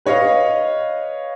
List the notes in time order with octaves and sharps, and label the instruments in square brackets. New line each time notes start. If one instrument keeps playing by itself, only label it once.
[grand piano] B4 C#5 D#5 F5